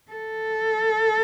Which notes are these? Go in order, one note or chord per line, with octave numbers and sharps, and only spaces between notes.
A4